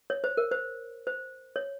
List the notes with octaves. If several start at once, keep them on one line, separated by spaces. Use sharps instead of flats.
C#5
C5
A#4
C5
C5
C#5